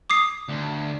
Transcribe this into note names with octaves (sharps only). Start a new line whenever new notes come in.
D6 D#6 C7
D2